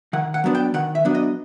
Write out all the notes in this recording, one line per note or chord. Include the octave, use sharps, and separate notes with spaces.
D#3 F#5
F#5
F#3 B3 D4
G5
D#3 F#5
E5
F#3 B3 D4
D#5